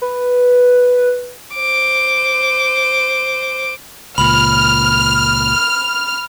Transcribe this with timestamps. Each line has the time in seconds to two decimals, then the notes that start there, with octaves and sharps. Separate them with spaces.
0.02 B4
1.55 C5 D6
4.18 C#2 A#2 B5 F6 F7